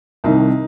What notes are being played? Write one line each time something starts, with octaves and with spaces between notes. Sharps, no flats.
C2 C3 D#3 D#4